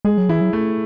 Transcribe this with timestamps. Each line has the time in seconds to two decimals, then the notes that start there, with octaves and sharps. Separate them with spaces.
0.05 G#3 G#4
0.18 F#3
0.29 E3 E4
0.41 F#3
0.53 A3